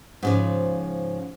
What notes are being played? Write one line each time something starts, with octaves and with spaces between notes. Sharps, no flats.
G#2 C#3 F3